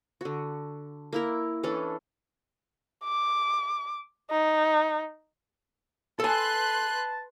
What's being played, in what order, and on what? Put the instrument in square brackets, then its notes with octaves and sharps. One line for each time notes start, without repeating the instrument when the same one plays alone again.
[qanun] D3 F#4
A#3 E4 A#4
E3 C#4 D4 A4
[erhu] D6
D#4
[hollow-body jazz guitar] A4 G#5 [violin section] B4 C6 F#6 [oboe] A5